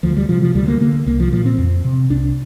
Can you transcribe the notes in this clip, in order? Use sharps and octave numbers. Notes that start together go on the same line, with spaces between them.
D2 F3
G3
C3 F3
F3
D2 G3
A#3
D3 A#3
C2 A#3
F3
A#2 F3
C4
F2
C3
C2 D4